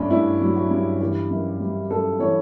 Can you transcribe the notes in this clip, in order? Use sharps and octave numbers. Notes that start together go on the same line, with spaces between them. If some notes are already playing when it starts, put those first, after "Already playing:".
Already playing: G2 A3 C#4 D4
G2 E4
F#3
F#4
G2
E3 G4
F#2
G3
F#2 A4
E3 C#5